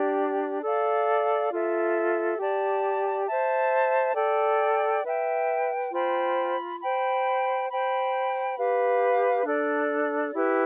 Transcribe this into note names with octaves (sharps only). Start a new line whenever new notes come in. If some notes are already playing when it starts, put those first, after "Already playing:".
Already playing: D4 G4 D5
A4 D5 F5
F4 A4 E5
G4 D5 A5
C5 E5 A5
A4 D5 G5
B4 E5 G5
F4 C5 G5 B5
C5 G5 B5
C5 G5 B5
G4 B4 F5
D4 A4 D5
E4 G4 B4